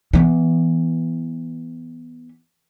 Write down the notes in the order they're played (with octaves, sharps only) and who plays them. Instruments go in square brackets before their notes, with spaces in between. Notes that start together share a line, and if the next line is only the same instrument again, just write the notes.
[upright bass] E3 B3